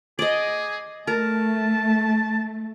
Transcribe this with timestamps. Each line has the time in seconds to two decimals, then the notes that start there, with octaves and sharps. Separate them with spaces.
0.19 G#4 D5 D#5
1.07 A3 A#4 A5